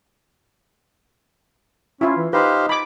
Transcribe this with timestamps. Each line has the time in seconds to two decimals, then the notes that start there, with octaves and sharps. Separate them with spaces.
2.01 C#4 E4 F4
2.17 E3
2.33 D#4 G4 B4 C5 F5
2.69 B5 D6